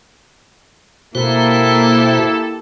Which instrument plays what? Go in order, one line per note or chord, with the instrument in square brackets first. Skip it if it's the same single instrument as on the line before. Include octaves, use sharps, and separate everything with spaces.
[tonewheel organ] B2 F#4 C5 [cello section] A#3 [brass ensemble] E4 G4 A4